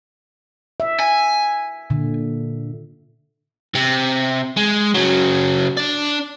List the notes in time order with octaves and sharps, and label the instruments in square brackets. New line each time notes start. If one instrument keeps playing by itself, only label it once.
[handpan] E5
[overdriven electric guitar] G#5
[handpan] A#2 D3
[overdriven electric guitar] C3
G#3
C#3 F#3
D4 D5